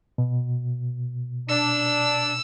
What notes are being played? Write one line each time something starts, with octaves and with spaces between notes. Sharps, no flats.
B2
D4 E6